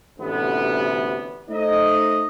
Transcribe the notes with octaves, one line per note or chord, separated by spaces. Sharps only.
A1 D2 C3 B3
A3 D#4 C5 D#5